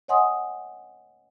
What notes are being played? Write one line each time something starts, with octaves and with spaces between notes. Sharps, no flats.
C#5 D#5 F#5 G#5 C6 D#6